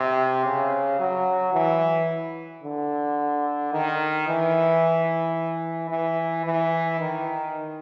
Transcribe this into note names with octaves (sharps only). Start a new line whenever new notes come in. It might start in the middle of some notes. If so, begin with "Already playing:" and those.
Already playing: C3
C#3
F#3
E3
D3
D#3
E3
E3
E3
D#3